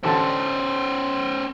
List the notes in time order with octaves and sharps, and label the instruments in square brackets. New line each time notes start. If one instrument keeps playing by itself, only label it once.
[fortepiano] A1 D3 A5 [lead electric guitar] C#4 C5